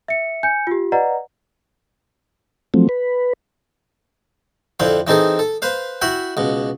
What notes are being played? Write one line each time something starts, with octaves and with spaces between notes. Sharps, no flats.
E5 C#7
G#5 G6 C#7
F4 G4
B4 D5 D#5 F#5 A#5
F3 F#3 A3 C4
B4
F2 D3 C4 E4 F5
E3 C4 D#4 G#4 A4
A4
B4 C5 F5
E4 F#4 E5 F#5 G5
C#2 B2